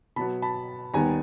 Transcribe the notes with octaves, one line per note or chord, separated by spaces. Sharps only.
B2 F#3 B3 A5 B5
A5 B5
D#2 D#3 G3 B3 G#5 A#5